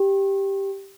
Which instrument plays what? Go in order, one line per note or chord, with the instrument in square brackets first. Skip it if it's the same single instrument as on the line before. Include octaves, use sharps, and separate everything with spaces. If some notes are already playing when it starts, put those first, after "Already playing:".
Already playing: [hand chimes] G4